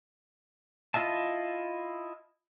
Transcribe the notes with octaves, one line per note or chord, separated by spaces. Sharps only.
E4 F4 D#5 E5 A5